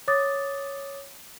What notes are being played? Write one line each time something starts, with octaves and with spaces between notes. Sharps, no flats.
C#5 D6 D#6 A6